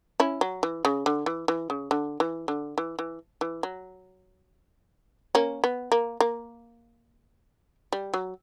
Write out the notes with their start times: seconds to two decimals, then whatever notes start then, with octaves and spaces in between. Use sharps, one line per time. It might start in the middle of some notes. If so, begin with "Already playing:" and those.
0.20 C#4 E4
0.41 F#3
0.63 E3
0.85 C#3
1.06 D3
1.26 E3
1.48 E3
1.70 C#3
1.91 D3
2.20 E3
2.48 D3
2.78 E3
2.99 E3
3.41 E3
3.63 F#3
5.35 A#3 C#4
5.64 B3
5.92 A#3
6.20 A#3
7.93 G3
8.14 F#3